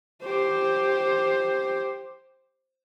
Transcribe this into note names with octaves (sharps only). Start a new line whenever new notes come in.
G4 C5